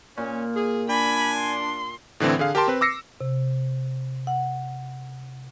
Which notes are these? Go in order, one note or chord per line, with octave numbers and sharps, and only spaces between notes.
A#2 C#4
G#4
D4 G#5 B5
C6
A2 D3 E3 C4
D3 G#4 F5
G4 A#4 G5 A5 C6
C4 B4
D6 E6 A#6 C7 C#7
C3
F#5